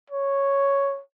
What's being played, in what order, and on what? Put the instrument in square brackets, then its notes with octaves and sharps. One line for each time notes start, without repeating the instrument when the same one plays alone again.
[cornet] C#5